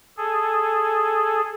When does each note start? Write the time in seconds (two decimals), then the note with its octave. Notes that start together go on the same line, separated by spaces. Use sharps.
0.18 G#4 A4